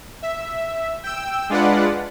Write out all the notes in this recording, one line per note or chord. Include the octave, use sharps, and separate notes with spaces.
E5
G5 E6
G#3 D4 F4 B4 D5 F#5